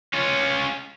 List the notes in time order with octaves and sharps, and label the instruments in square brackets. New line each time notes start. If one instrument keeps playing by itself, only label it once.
[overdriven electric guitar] C#4 F4